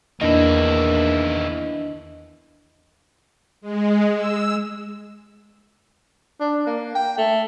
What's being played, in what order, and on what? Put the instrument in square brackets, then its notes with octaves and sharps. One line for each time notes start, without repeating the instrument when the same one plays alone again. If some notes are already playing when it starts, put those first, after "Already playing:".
[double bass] E2 [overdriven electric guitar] D#3 E4 [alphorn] A#3 [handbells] D4 D#5
[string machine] G#3
E6
[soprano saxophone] D4
A#3
G5
A3